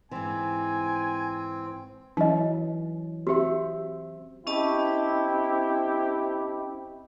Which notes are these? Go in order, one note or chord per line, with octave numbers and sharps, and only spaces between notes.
G#2 E3 C4 G#5
E3 F#3 C#4 D#4 D#5
C4 F#4 G4 C5 E5
C4 C#4 E4 G4 D#5 A5